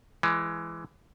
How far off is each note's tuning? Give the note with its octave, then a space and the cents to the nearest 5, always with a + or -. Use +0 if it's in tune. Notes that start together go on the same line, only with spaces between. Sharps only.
E3 +15 G#3 +10